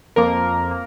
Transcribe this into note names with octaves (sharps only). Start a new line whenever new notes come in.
F2 F3 A#3 A#4
A#3